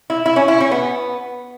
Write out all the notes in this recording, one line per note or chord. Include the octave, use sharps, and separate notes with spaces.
E4
E4
C#4
E4
C#4
B3